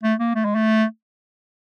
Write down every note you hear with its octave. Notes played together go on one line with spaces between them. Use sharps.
A3
A#3
A3
G#3
A3